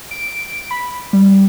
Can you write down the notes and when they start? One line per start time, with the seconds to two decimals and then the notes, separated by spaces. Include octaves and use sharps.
0.11 D7
0.71 B5
1.13 G3